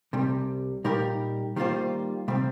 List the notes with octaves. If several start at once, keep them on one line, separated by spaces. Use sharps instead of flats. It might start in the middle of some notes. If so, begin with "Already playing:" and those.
C2 C3 G3
A#2 G3 D#4 G4 A#4
D#3 G3 A#3 F4 C5
C3 G3 C4